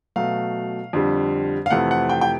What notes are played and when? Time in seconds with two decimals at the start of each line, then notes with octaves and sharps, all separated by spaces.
0.16 B2 F#3 A3 F5
0.93 F2 D3 G3
1.66 F5
1.71 F2 C3 E3 A3 F#5
1.91 F#5
2.09 G5
2.21 G5